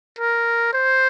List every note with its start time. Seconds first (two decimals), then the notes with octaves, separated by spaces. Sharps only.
0.19 A#4
0.73 C5